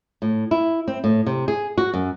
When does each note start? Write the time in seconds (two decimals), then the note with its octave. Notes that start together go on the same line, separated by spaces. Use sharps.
0.22 A2
0.51 E4
0.88 C4
1.04 A2
1.26 C3
1.48 G#4
1.78 F#4
1.94 F#2